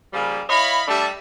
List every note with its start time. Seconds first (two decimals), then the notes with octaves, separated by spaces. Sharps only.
0.13 C#3 F3 G3 A#3
0.49 E4 C#5 D#5 F5 B5
0.88 G3 A3 D4 E5 A5